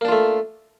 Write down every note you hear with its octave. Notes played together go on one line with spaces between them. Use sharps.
A3 A#3 D4 F4